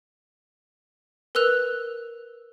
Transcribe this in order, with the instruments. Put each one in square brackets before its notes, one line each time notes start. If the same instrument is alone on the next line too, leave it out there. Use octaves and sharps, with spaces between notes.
[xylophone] A#4 B4 E6 F#6 F7